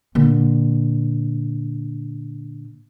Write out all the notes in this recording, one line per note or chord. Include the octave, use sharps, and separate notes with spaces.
A#2 D3